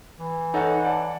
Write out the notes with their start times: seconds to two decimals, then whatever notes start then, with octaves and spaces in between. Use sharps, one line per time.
0.18 E3
0.54 D#4 A4 C#5 F#5
0.84 D5 A5